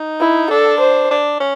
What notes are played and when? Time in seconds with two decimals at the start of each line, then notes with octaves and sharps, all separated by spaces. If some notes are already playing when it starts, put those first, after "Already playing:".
Already playing: D#4
0.20 E4
0.50 D4 A4
0.80 C5
1.11 D4
1.40 C#4